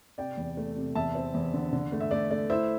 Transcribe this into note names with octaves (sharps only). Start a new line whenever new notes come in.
C3 D5 G5
E2
A3
C3
E2 E5 A5
C4
E2
D3
D3
A3
E5
A3 D5
A3 D5
E4 C5 E5